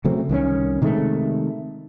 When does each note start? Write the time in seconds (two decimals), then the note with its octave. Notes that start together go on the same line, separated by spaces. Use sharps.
0.04 C#3 F#3 A3 C4
0.29 C2 D#3 E3 C#4
0.82 C3 D#3 G#3 A3